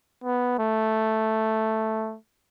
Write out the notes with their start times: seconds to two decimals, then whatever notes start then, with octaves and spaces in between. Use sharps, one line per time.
0.24 B3
0.59 A3